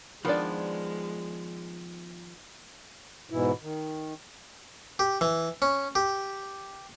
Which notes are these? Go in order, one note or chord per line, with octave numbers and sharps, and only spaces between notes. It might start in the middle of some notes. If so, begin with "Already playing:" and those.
D#3 F3 G#3 B3 D4 D5
G#2 B2 E3 E4
D#3
G4
E3
C#4
G4